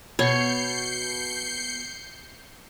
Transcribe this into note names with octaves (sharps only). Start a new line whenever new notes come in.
B2 C#5 G6 C7 C#7